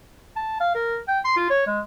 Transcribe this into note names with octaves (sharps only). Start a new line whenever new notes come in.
A5
F5
A#4
G5
C6
F4
C#5
G#3